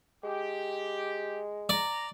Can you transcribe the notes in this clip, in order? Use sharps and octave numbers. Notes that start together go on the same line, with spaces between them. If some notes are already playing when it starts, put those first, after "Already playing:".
G#3 G4
D5 A#5